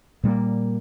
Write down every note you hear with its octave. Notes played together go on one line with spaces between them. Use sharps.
A#2 G3 G#3 A#3